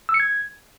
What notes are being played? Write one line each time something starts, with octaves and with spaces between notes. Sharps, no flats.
E6
C#7
G#6